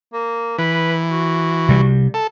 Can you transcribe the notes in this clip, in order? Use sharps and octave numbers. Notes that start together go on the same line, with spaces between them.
A#3
E3 B4
F#4
C3 G3
A4